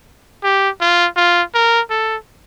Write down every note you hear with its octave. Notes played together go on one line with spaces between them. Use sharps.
G4
F4
F4
A#4
A4